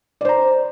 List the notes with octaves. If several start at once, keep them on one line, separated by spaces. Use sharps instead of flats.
C5 D5 A#5